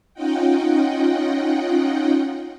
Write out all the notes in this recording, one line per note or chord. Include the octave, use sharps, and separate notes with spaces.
C#4 D#4 F4 D#5 F#5 G5